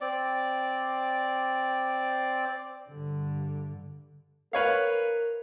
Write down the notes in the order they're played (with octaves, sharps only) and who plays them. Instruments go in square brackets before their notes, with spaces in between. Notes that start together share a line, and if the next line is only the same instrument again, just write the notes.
[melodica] C4 D5
[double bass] G2 D3
[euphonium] A#4 [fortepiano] B4 C#5 F5